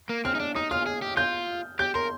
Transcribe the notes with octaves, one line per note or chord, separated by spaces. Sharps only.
A#3
C4 F6
D#4
D4
D#4 D#6
F4 F6
G#4
G4
F4 G6
G4 G6
A#4 C6